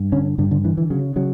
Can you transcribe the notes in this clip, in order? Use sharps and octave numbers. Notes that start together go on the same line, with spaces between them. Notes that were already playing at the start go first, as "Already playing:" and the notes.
Already playing: G2
D3 C#4
G2 D3
D3
D3 E3
E3
C#3 F#3
C#3 F#3